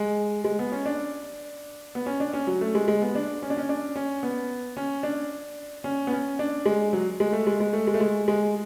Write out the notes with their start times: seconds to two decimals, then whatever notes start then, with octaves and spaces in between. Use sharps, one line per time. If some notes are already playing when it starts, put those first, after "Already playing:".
Already playing: G#3
0.44 G#3
0.59 B3
0.72 C#4
0.85 D4
1.95 B3
2.06 C#4
2.20 D4
2.34 C#4
2.47 F#3
2.61 A3
2.75 G#3
2.88 G#3
3.02 B3
3.15 D4
3.42 C#4
3.50 D4
3.57 C#4
3.69 D4
3.96 C#4
4.23 B3
4.77 C#4
5.03 D4
5.84 C#4
6.07 B3
6.12 C#4
6.39 D4
6.66 G#3
6.93 F#3
7.20 G#3
7.33 A3
7.47 G#3
7.60 G#3
7.73 A3
7.87 G#3
7.94 A3
8.00 G#3
8.28 G#3